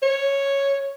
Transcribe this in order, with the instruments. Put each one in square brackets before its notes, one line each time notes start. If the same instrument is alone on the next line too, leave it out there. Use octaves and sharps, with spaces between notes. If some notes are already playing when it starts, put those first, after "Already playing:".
[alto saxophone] C#5